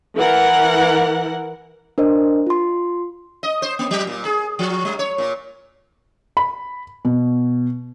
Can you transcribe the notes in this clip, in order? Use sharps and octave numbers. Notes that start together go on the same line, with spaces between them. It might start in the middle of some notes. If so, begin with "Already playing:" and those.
E3 A#4 F#5
D4 A#4 C5 D#5
F4 C6
D#5
C5
A#3
F#3
A#2
G#4
F3
G3
C#5
A#2
B5
B2